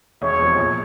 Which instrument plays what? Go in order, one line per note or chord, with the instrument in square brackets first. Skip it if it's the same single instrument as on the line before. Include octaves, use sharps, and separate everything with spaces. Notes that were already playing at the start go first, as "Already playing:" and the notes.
[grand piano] E1 [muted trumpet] C#5
[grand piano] E2 C3 F3 G#3
A#1